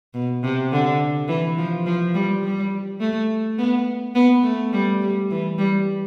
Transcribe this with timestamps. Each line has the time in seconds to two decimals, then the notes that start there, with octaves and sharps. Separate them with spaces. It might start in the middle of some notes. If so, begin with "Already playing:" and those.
0.14 B2
0.43 C3
0.72 D3
1.28 E3
1.58 F3
1.86 F3
2.15 G3
2.44 G3
3.00 A3
3.58 B3
4.15 B3
4.44 A3
4.73 G3
5.02 G3
5.31 E3
5.58 G3